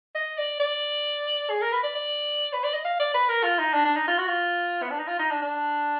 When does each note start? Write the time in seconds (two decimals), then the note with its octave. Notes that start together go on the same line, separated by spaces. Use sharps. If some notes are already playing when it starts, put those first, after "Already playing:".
0.15 D#5
0.38 D5
0.60 D5
1.49 G#4
1.62 A#4
1.72 B4
1.83 D5
1.95 D5
2.53 B4
2.64 D5
2.74 D#5
2.85 F5
3.00 D5
3.14 B4
3.29 A#4
3.43 F4
3.59 D#4
3.73 D4
3.85 D4
3.96 D#4
4.08 F4
4.18 F#4
4.27 F4
4.82 B3
4.90 D4
4.99 D#4
5.08 F4
5.19 D#4
5.31 D4
5.42 D4